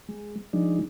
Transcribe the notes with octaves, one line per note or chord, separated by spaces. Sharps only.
G#3
F3 G#3 D4 D#4